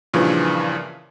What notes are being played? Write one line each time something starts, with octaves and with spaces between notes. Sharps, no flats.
G2 A#2 C#3 E3 F3